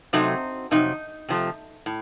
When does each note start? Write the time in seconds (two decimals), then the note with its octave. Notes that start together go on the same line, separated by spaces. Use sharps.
0.13 C3 F#3 A3 C4 D#4
0.71 F2 C3 F#3 D#4
1.28 C3 F3 A3
1.86 A2